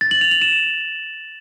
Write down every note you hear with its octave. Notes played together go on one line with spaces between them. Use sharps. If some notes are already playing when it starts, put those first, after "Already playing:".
A6
F#7
F7
F#7
E7